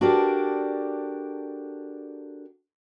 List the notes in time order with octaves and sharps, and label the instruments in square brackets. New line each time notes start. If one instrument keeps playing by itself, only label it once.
[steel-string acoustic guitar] D4 F#4 G4 A4 A#4 D5